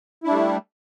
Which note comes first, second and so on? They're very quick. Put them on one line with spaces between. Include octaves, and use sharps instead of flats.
E4 D4 G3 A3